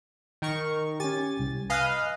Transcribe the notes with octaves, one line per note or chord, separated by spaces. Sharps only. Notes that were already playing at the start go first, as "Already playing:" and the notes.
D#3 A#4 C#6
C#4 G4 G#5 A6
C2
B4 D#5 F5 G#5 F6 F#6